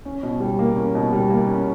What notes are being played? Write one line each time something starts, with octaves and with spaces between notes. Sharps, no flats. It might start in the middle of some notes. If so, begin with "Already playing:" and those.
C#4
B2
G3
A#3
C#4
B2
G3
A#3
C#4